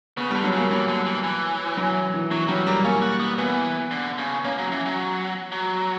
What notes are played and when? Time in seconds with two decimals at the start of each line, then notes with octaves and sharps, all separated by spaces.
0.17 C#3 B3
0.31 D3 G3
0.44 F#3
0.53 C#3 A#3
0.71 E3 F#3
0.88 D3
1.06 E3
1.24 E3
1.77 F#3
2.14 E3
2.31 E3 F#3
2.48 F#3 G3
2.67 G3 A#3
2.84 A#3 C#4
3.02 F#4
3.20 B3
3.38 E3 B3
3.91 D3
4.18 C#3
4.45 A#3 C#4
4.58 F#3
4.72 E3
4.86 F#3
5.52 F#3